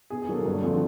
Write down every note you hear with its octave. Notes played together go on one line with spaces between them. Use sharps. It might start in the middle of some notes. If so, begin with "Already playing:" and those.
B2 G#4
G#4
F#3 A#3 A4
G2
D3 F3 A3 C4